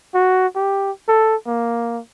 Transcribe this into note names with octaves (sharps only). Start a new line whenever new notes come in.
F#4
G4
A4
A#3